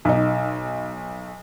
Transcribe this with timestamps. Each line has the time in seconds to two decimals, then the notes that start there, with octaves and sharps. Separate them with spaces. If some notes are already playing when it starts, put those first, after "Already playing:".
0.05 B1 D#4